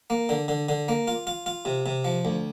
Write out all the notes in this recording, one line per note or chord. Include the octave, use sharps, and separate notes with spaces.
A#3
D3
D3
D3
A#3
F4
F4
F4
C3
C3
F3
D2